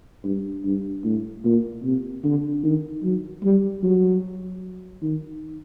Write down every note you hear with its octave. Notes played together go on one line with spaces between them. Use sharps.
G2
G2
A2
A#2
C3
D3
D#3
F#3
G3
F#3
D#3